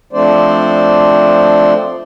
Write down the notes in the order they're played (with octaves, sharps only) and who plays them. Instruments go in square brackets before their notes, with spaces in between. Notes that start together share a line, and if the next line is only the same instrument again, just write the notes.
[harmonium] F3 A3 C4 D4 C5 D5